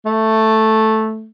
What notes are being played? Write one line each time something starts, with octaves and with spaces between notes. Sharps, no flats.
A3